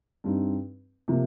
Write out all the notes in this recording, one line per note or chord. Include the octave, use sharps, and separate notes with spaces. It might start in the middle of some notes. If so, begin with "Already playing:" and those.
G2 G3 C4 D#4
C3 F3 A#3